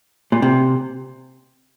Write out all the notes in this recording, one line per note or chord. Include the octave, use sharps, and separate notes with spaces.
A#2
C3